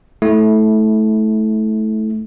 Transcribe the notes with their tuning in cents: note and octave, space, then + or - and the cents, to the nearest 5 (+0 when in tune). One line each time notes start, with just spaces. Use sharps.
A3 -15 E4 -25